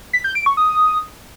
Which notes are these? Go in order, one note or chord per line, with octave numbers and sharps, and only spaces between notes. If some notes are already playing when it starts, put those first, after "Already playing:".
B6
G6
D7
C#6
D#6